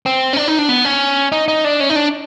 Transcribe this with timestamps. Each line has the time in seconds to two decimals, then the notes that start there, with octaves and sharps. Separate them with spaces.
0.06 C4
0.33 C#4
0.37 D4
0.48 D#4
0.58 D4
0.69 B3
0.85 C#4
1.32 D#4
1.48 D#4
1.64 D4
1.80 C#4
1.90 D#4
1.96 D4